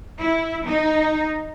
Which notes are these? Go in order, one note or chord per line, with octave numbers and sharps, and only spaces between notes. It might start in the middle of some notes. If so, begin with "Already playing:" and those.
E4
D#4